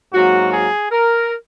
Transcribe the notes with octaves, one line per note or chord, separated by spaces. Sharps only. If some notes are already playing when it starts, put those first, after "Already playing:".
G#2 F#3 A#3 F#4
G#4
A#4